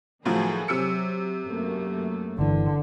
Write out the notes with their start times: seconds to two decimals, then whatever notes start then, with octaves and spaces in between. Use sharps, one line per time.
0.25 A2 D#3 F3 F#3 G#4 A4
0.68 C3 F#3 E6 C#7
1.45 F#2 A3 A#3
2.39 G1 D3 E3